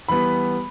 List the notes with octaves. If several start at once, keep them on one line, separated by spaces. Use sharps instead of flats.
E3 G3 B3 B5